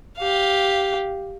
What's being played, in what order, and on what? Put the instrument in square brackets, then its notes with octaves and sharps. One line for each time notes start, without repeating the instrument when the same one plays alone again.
[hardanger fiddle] G4 F5